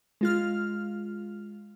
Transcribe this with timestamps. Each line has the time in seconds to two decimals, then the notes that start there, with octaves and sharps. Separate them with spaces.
0.21 G#3 F4 F6